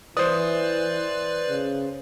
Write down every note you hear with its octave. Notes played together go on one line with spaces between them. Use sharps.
E3 B4 C5 D5 D#6
C#3